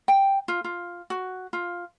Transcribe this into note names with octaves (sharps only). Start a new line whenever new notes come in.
G5
F4
F4
F#4
F4